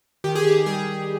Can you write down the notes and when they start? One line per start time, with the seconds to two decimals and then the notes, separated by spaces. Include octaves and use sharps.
0.24 D#3 G4
0.35 G#4
0.47 G4
0.66 G3 G#4